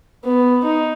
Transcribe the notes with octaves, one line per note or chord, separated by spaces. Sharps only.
B3
D#4